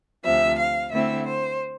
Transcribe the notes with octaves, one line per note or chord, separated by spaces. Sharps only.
D2 C3 F3 E5
F5
D3 A3 C4 E4 E5
C5